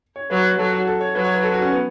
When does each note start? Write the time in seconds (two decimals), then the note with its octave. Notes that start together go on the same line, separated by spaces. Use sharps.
0.16 C#5
0.30 F#3 B4
0.58 F#3 A4
0.72 F#4
0.87 A4
1.01 C#5
1.15 F#3 B4
1.24 C#5
1.34 B4
1.43 A4
1.53 F#4
1.62 C#4
1.72 B3